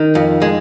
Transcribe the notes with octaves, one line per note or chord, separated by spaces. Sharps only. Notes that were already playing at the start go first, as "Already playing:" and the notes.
Already playing: D#3
F2
G#3